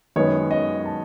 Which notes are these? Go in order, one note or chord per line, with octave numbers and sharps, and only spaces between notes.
F#2 D#3 G#3 B3 C#5
D#5
A5